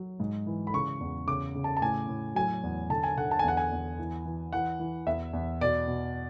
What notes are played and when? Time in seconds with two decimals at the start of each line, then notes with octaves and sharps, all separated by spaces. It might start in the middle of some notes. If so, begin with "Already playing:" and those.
Already playing: F#3
0.20 G#2
0.46 E3
0.67 B5
0.74 C#3 C#6
1.00 E2
1.27 C#3 D6
1.55 C#3
1.64 A5
1.77 A5
1.82 A2 G#5
2.08 A2
2.35 F#3 G#5
2.63 E2
2.90 D3 A5
3.04 G#5
3.17 D3 F#5
3.31 A5
3.39 G#5
3.44 E2 F#5
3.57 G#5
3.71 E2
3.98 E3
4.25 E3
4.53 E3 F#5
4.79 E3
5.07 E2 E5
5.33 E2
5.61 B2 D5
5.87 B2